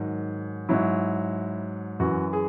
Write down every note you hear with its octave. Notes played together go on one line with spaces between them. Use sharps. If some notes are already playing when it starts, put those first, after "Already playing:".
Already playing: G#2 D#3 F#3
G#2 F#3 E4
F#2 E3 F#4
G#4